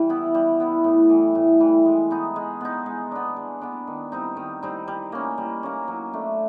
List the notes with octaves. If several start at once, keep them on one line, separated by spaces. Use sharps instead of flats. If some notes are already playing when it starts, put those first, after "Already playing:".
Already playing: E3 G3
B3 E4
G3
B3 E4
A2
E3 G3
A2
E3 G3
G#3
B3 D#4
G#3
B3 D#4
G#3
B3 D4
G#3
B3 D4
D#3
G3 C4 D#4
D#3
G3 C4 D#4
G3
A#3 C#4
G3
A#3 C#4
F#3
A3 D4